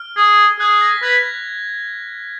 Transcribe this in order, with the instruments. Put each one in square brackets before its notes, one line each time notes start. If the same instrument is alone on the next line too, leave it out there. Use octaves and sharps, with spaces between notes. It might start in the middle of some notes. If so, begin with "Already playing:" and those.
Already playing: [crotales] F6
[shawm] G#4
[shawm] G#4 [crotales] F#6
[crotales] F#6
A#6
B6
[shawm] B4 [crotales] G#6